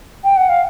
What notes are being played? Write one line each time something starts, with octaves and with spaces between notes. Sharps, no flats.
G5
F#5
F5